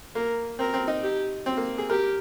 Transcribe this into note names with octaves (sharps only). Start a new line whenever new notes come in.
A#3 A#4
C4 A#4
C4
D#4
G4
C4
A#3
G#4
G4 A#4